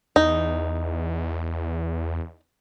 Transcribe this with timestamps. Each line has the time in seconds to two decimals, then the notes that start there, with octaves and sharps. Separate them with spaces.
0.16 E2 D#4